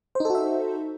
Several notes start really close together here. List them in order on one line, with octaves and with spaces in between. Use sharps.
C5 D#4 A4 F#4 E5